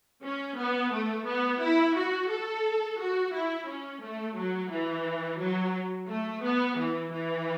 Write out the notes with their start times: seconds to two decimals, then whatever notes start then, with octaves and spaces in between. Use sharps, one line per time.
0.23 C#4
0.57 B3
0.92 A3
1.26 B3
1.60 E4
1.96 F#4
2.30 A4
2.99 F#4
3.33 E4
3.68 C#4
4.02 A3
4.36 F#3
4.70 E3
5.39 F#3
6.08 A3
6.43 B3
6.77 E3
7.12 E3